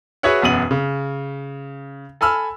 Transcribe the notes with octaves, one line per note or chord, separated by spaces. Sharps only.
F#4 G#4 B4 C#5 E5 F#5
E1 F#2 B3 D#7 F#7
C#3
A4 G#5 B5 E6 F6